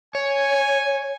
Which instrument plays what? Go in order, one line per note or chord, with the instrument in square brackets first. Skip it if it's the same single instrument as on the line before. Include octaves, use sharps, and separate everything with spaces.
[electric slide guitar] C#5 [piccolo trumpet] G#5